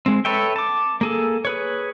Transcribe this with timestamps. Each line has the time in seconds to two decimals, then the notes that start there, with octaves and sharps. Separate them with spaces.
0.06 G#3 C4
0.25 A4 B4 C#5 E5 G5
0.56 A5 D6
1.01 A#3 G#4 A4
1.45 G#4 B4 C#5